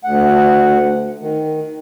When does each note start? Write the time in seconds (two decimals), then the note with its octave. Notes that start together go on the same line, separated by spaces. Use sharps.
0.04 D2 F#5
1.21 D#3